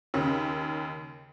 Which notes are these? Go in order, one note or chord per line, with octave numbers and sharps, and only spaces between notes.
D#2 C#3 C#4